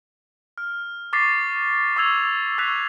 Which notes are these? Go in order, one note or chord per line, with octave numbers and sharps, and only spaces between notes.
F6
C#6 D6 A6 B6 C7
C#6 D6 E6 G#6 F7
C#6 E6 F#6 B6 F7